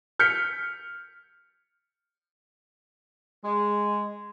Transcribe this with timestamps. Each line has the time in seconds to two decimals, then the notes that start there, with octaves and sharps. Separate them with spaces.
0.19 F6 G6 B6 C#7
3.43 G#3